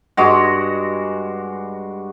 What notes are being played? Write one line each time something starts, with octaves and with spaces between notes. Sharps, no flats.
G2 G#3 F#4